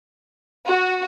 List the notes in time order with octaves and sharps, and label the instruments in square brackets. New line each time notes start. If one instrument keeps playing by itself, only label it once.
[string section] F#4